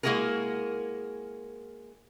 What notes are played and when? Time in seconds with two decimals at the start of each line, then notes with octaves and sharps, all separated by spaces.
0.03 G#3 A#3 E4 F#4 G#4 A#4